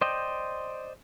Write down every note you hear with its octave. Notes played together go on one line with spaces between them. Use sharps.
C5 D5 D#5 G5